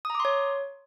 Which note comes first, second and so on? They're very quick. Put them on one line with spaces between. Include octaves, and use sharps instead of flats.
D#6 A#5 D6 C6 C#5